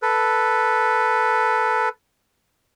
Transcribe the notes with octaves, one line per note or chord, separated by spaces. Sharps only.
A4 B4